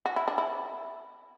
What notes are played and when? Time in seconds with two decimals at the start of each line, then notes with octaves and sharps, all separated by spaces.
0.06 F#4
0.16 E4
0.28 D4
0.38 E4